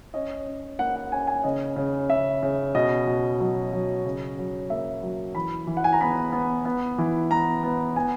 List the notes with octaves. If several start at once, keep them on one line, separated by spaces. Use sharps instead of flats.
C#4 D#5
C#4
A#3 F#5
F#5
C#4 G#5
G#5
C#3 D#5
C#3
C#3 E5
C#3
B2 D#5
B2
F#3
F#3
C#3
F#3
A#3 E5
F#3
E3 B5
E3
F#5
G#5
A#5
B3 B5
B3
B3
E3
B3 A#5
B3
B3 G#5